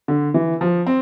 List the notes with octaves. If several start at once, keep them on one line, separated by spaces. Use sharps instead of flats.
D3
E3
F3
C4